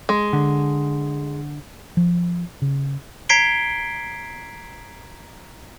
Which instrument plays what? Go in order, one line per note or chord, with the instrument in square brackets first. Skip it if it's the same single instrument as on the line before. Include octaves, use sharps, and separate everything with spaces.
[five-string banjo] G#3
[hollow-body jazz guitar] D3
[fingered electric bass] F3
C#3
[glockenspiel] A#5 G#6 B6 C7 D7 G7